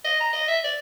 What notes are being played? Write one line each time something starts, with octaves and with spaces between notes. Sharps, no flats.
D#5
A#5
D#5
E5
D5